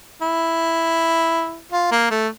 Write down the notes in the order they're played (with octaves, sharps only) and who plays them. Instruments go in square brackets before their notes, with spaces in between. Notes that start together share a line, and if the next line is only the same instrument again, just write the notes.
[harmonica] E4
F4
A#3
A3